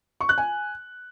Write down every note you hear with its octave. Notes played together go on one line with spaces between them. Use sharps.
C#6
F#6
G#5